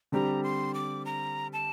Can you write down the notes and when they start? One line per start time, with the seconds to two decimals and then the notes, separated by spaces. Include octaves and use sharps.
0.12 D3 G3 C4 G4 A#5
0.44 C6
0.74 D6
1.06 A#5
1.53 A5